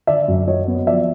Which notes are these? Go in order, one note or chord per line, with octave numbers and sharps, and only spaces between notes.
D3 D5 E5
F#2
F#3 C#5 D#5
B3
F3 D5 E5